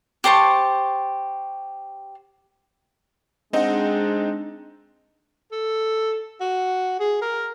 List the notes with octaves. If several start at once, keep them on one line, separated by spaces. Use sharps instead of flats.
G4 C5 A5 C#6
G#3 C4 D4 D#4 D#5 F#5
A4
F#4
G#4
A#4